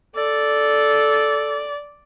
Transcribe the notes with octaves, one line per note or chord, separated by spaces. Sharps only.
A4 D5